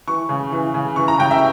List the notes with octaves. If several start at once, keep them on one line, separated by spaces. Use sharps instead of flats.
E3 C#6
C#3
E3
C#3
E3 C#6
A#5
C#3 G5
E5